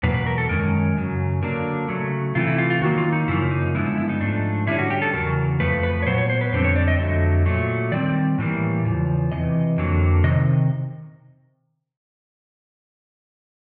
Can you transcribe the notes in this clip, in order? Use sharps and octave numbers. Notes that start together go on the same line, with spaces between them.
E2 B2 F#3 A#3 B4
B4
A#4
A4
F#2 D#3 G#3 C#4 A#4
F#2 C#3 F#3
D3 F#3 A#3 D4 A#4
C#3 F#3 A3
C3 E3 A3 F4
E4
F4
F4
D#3 F#3 A#3 F#4
F4
D#4
F#2 C#3 F3 A#3 E4
D#4
G2 D3 F3 G#3 B3 E4
E4
E4
D#4
G#2 F3 A3 D4
D3 G3 A#3 C#4 E4
F#4
G4
A4
E2 C#3 F#3 A#4
F2 C#3 F3 A3 B4
B4
C#5
A#2 F#3 B3 C5
C#5
C5
B4
F2 D3 G3 C4 C5
C#5
D5
D#5
F2 D3 F#3 A3
A#2 F#3 A3
D#3 G3 C4 D5
A2 E3 G3 A#3
E2 C#3 F3
C3 E3 D#5
F2 D3 F#3 A#3
C3 D#3 D#5